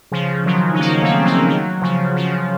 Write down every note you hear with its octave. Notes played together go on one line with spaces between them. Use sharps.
C#3 F3
D#3 F#3
D#4
A#3 C#4
A3 C4
F#3 A#3
D#3 F#3
C#3 F3
C#3 F3